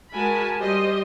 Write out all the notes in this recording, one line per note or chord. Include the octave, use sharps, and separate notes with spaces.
G#3 F#4 A#4 G#5 A5 B5
G3 G4 C5 D#5